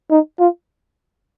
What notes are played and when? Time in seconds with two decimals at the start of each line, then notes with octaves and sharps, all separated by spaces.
0.11 D#4
0.39 F4